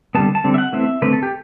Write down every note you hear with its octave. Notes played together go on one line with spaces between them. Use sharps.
D3 G3 B3 A5
A5
D3 G3 C4
E5
F#5
E3 A3 C4 E5
D3 A3 C4 B4
A4
G4